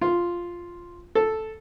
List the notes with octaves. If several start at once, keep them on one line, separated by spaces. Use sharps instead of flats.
F4
A4